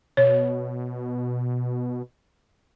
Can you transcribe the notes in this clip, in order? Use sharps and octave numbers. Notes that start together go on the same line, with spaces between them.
B2 C#5